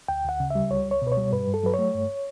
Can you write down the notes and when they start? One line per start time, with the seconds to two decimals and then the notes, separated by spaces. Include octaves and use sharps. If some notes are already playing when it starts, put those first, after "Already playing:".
0.08 D2 G5
0.24 D2 F#5
0.40 C#3
0.50 G3 E5
0.70 C#2 C#5
0.85 C#2
0.91 C#5
1.02 B2
1.07 B4
1.12 C#5
1.17 G3
1.32 G2 B4
1.48 G2
1.54 A4
1.63 F#3 B4
1.74 C#5
1.79 A3
1.95 G2